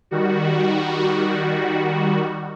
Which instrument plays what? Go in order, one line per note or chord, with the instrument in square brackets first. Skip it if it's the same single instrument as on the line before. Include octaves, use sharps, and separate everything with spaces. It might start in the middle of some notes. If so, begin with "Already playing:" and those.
[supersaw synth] D#3 G3 F#4